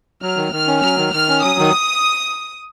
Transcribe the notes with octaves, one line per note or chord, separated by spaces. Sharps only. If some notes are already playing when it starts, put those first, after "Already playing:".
F#3 F6
D#3
D#3 F6
C#4
F#3 F6
D#3
D#3 F6
C#4
F#3 D#6
D#3